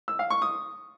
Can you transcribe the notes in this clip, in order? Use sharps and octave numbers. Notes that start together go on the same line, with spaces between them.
E6
F5
C#6
D#6